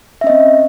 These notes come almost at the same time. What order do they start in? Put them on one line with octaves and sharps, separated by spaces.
E5 C#4 D#5 C4